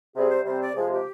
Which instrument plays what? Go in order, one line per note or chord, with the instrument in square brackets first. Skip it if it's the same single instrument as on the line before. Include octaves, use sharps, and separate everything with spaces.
[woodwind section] C3 G3 C4 G#4
C5
C3 G3 C4 C5
D5
C3 F3 G#3 G#4
G4